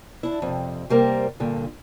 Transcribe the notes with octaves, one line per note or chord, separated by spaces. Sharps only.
D4 E4
F2 C3
C3 G3 A#3 A#4 C5
G2 A#2 D3